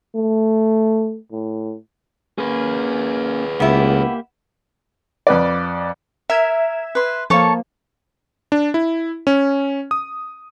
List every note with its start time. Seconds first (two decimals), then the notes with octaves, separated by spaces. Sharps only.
0.15 A3
1.32 A2
2.38 A#3 C#4 G#4 B4
3.60 C#2 A#3 B3 E4 G4
5.27 F2 B4 D5
6.30 A#4 E5 G#6 E7
6.95 B4 C6
7.30 F3 A#3 A4 C#5 A5
8.52 D4
8.74 E4
9.27 C#4
9.91 D#6